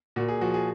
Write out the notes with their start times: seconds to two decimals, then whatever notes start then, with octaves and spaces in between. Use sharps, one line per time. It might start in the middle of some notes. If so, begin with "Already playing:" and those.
0.16 A#2 F#4
0.28 G#4
0.41 F3 F#4
0.54 G#4